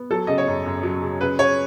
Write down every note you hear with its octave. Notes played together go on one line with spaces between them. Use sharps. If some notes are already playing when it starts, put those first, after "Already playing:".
Already playing: B3
F#3 A4
C#3 D#5
C#5
F#2
F#2
F#3
C#3
C#3 B4
C#3 C#5